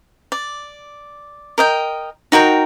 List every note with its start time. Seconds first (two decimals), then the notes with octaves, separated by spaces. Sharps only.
0.32 D5
1.58 A#4 D#5 G5
2.32 D#4 F#4 A#4 G5